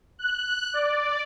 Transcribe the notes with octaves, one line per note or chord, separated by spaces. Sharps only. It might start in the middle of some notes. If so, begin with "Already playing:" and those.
F#6
D5